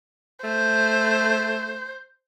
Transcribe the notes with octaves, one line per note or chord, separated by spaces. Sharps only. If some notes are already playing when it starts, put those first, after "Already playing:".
A3 C5